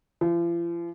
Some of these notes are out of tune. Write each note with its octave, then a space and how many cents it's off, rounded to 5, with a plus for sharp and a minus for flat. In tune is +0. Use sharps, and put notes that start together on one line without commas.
F3 -40